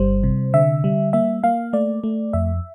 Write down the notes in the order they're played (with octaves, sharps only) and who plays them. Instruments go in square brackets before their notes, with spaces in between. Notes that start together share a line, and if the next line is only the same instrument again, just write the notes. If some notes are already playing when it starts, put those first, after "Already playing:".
Already playing: [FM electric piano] G1 G3 C5
C3
D3 E5
G3
A#3 E5
A#3 F5
A3 D5
A3
F2 E5